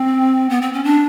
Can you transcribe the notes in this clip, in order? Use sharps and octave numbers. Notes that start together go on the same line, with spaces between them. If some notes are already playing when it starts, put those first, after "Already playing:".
Already playing: C4
B3
C4
C#4
D4